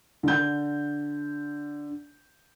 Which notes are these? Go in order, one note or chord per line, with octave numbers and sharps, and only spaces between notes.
D3 G6